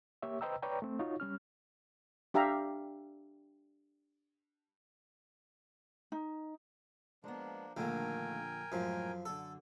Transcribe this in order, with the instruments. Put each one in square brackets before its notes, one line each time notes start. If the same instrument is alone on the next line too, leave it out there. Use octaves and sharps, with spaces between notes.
[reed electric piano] A#3 G4 C#5 E5
B4 C5 D#5 G5 A#5 E6
B4 C#5 D5 G5 A#5
A3 C4
D#4 F4 F#4 C#5
G3 C#4 F6
[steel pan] D4 G4 E5 F5 A#5
[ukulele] D#4
[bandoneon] F3 A#3 D4 [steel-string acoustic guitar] G#3 B3
[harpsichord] A#1 D3 [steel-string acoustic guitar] D#3 A3 A#3 [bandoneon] A#4 G5 G#5
[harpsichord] F#2 F3 [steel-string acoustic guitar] A2 G#3
[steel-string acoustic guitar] F#2 D3 [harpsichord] A4